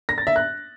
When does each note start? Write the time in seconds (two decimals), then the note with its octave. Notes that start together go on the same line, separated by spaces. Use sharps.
0.09 A#6
0.18 A6
0.27 E5
0.36 F#6